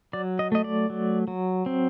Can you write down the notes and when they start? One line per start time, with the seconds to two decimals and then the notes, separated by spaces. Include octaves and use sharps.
0.13 F#3 D5
0.39 D#5
0.52 A3 D#5
0.64 D5
0.90 F#3
1.28 F#3
1.66 C4